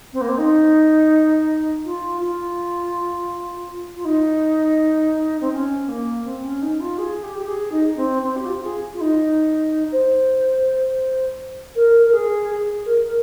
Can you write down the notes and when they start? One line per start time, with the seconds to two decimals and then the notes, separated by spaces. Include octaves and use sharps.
0.13 C4
0.21 A#3
0.28 C4
0.38 D#4
1.84 F4
2.20 F4
3.96 F4
4.05 D#4
5.41 C4
5.52 C#4
5.88 A#3
6.25 C4
6.43 C#4
6.62 D#4
6.80 F4
6.98 G#4
7.23 G4
7.37 G4
7.47 G#4
7.72 D#4
7.96 C4
8.21 C4
8.36 G4
8.46 F4
8.63 G#4
8.94 F4
9.01 D#4
9.92 C5
11.76 A#4
12.06 A#4
12.13 G#4
12.50 G#4
12.86 A#4